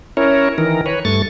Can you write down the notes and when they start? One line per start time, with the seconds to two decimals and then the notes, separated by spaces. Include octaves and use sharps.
0.17 C#4 E4 A#4 C#5
0.58 D#3 E3 A#4
0.86 B4 C#5
1.05 G2 A3 C#6 A6